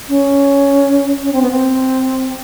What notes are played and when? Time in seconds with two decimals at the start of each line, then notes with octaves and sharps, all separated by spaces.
0.09 C#4
1.23 C#4
1.33 C4
1.42 B3
1.51 C4